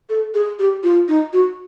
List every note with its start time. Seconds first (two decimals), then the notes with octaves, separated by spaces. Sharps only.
0.09 A4
0.34 G#4
0.59 G4
0.83 F4
1.08 D#4
1.33 F#4